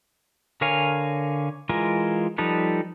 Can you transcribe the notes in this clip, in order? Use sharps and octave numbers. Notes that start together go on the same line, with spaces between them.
D3 A#4 C#5 F5 G#5
E3 G#3 F4 A#4
F3 G3 D#4 A4 B4